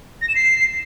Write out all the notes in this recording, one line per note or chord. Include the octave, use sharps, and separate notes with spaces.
A#6
E7
C7